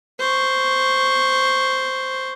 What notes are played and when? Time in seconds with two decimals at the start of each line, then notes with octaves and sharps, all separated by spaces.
0.19 C5 C#6